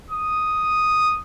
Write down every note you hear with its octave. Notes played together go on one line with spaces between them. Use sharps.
D#6